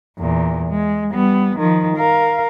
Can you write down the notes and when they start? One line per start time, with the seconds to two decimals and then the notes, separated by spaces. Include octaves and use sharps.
0.19 E2 A#2
0.69 G#3
1.13 G3 B3
1.58 D#3 F3
1.97 A#4 F5